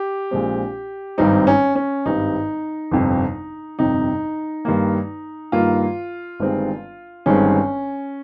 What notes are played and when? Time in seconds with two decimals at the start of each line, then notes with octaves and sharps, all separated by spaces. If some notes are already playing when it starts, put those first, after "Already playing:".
Already playing: G4
0.31 A#1 A#2 G#3 C4
1.18 G#1 G2 G3 C4 D#4
1.47 C#4
1.75 C#4
2.06 G#1 G2 G3 C4 D#4
2.92 G1 F2 C3
3.79 G1 F2 C3 D#4
4.65 G2 D#3 A#3
5.52 G2 D#3 A#3 F4
6.40 G1 G2 D#3 G#3 C4
7.26 G1 G2 D#3 G#3 C4 C#4